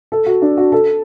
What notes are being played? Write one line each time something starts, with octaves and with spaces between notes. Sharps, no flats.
A4
F#4
D4
F#4
A4